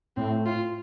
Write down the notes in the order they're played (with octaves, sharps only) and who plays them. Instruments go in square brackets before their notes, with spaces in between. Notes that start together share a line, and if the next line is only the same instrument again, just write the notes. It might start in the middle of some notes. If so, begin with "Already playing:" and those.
[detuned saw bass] A2 [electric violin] C4
[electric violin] F4